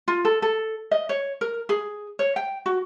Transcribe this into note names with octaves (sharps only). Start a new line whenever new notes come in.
F4
A4
A4
D#5
C#5
A#4
G#4
C#5
G5
F#4